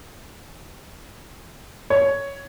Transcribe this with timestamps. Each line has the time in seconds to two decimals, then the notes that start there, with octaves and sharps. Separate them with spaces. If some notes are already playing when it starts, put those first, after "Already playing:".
1.90 C#5